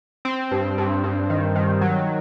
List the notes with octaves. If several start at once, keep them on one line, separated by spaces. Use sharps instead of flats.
C4
G2
G2
G2
D#3
D#3
F#3